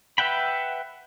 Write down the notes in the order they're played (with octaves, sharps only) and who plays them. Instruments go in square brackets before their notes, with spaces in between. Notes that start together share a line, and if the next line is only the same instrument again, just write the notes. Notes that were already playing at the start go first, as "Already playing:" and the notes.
[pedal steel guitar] B4 E5 F#5 G5 B5